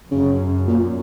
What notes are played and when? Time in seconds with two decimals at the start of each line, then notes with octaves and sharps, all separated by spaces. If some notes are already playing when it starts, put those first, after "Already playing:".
0.11 F#2 C#3
0.67 A#2